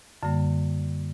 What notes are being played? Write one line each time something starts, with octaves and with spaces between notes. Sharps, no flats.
F#2 D3 G3 A#3